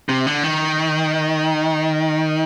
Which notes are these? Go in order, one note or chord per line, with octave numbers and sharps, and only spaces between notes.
C3
D3
D#3